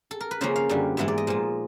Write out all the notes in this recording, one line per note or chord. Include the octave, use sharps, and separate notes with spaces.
A4
A#4
B4
C#3 F3 A#3 C#4 C5
F5
F#2 D3 G3
G#2 E3 G#3 B3 E5
D5
D#5
A#2 F3 G#3